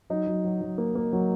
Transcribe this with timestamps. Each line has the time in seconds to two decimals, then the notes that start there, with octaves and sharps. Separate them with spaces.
0.10 F#3 D#4
0.27 F#3
0.44 F#3
0.61 F#3
0.78 A#3
0.95 A#3
1.13 F#3